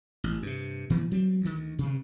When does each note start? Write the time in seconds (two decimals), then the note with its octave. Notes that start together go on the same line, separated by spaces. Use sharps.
0.24 A1
0.43 G2 C3
0.90 A#2 E3 F3
1.11 F#3 G3 C4
1.41 D2 D#3
1.79 G2 C3